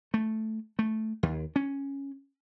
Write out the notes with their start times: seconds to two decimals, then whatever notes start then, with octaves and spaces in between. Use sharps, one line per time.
0.14 A3
0.79 A3
1.23 D#2
1.56 C#4